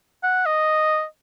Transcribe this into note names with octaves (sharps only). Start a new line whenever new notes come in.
F#5
D#5